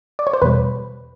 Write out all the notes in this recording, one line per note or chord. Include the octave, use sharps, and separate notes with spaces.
D5
C#5
C5
E2 B2 G3 B4